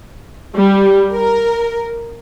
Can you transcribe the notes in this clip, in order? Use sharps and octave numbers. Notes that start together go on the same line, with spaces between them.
G3
A#4